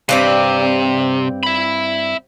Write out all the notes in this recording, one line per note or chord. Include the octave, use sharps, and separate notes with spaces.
G2 C3 C4 D5
E5 B5